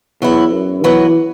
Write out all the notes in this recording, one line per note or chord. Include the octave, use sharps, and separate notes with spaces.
E2 F#3 B3 E4
F#2
E3 F#3 B3 F#4 B4